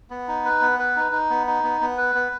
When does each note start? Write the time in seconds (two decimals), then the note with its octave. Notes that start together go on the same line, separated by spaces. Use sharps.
0.10 B3
0.28 D#4
0.45 B4
0.61 B3
0.79 B4
0.96 D#4
1.12 D#4
1.30 B3
1.47 D#4
1.64 B3
1.81 B3
1.98 B4
2.15 B3